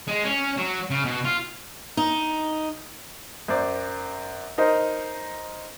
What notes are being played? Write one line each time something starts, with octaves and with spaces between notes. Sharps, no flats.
G#3
C#4
F#3
C#3
B2
F4
D#4
F#2 C5 D5
D#4 A#4 C5 D#5